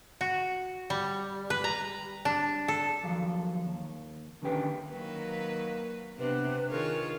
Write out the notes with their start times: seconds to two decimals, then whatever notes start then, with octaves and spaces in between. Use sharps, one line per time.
0.21 F#4
0.90 G3
1.50 B4
1.64 A#5
2.25 D4
2.68 A4
3.03 D#2 F3 F#3 F5
3.67 D#2
4.42 D3 D#3 C#4 G4 B4 G5
4.91 D#3 F#3 A#3 B4
6.18 C3 B3 D4 B4
6.70 D#3 F4 G#4 A#4 C#5